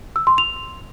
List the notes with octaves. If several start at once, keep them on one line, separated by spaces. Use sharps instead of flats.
E6
C6
F7